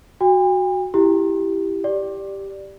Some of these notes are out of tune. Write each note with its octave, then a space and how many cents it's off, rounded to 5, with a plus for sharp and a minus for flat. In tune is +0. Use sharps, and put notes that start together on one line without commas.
F#4 +0 G5 +45
E4 +5 G4 +0
G4 +0 D5 +0